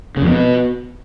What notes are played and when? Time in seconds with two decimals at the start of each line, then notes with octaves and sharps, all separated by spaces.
0.17 C#3
0.22 F2
0.27 B2